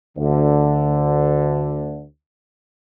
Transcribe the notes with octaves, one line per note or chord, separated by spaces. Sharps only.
D2 D3